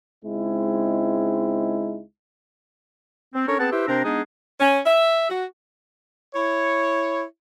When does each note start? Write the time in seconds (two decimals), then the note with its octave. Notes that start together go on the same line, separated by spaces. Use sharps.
0.23 C#2 G#3 C4 D#4 E4
3.34 C4
3.47 C#4 D4 A4 A#4 C#5
3.59 B3 C4 G#4 F#5 A5
3.71 E4 G4 B4 C5 E5
3.87 C3 C4 D4 A#4 C5 A#5
4.04 G#3 B3 D4 D#4 G#4
4.60 C#4
4.86 E5
5.30 F#4
6.35 E4 C#5